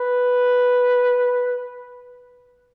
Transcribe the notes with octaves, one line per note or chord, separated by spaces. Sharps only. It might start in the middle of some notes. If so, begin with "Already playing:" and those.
Already playing: B4